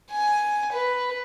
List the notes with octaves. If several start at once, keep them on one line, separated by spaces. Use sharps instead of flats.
G#5
B4